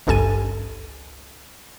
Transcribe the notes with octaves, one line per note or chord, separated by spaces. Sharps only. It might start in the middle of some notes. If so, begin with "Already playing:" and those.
G#1 C#2 G2 A4 G#5 D#7